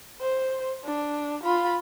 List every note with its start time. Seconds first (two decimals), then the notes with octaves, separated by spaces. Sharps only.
0.21 C5
0.84 D4
1.43 F4 B5